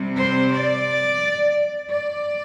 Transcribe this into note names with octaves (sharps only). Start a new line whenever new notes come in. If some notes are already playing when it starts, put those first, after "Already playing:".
Already playing: C3 G3 C4
C5
D5
D5